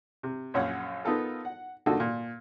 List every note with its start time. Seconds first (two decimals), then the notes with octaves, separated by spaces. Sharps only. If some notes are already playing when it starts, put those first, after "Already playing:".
0.23 C3
0.54 A#1 F#2 C#5 F5 F#5
1.05 B3 D#4 F4 A4 A#4
1.45 F#5
1.86 D3 A#3 D#4 F4 F#4 A4
2.00 A#2